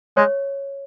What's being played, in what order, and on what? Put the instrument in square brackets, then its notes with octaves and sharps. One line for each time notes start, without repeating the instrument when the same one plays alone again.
[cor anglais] G#3 [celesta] C#5